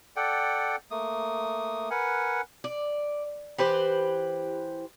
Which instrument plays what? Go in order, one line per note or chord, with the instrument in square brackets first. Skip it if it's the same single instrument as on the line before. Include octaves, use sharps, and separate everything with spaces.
[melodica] A4 D5 F#5 G5
A3 A#3 D#6
A#4 B4 F#5 G#5
[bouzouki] D5
E3 G4 B4 C5